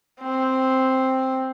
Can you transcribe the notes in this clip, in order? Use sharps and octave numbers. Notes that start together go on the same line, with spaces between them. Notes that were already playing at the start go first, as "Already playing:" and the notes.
C4